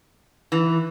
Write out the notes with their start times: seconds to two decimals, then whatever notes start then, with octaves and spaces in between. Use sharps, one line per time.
0.52 E3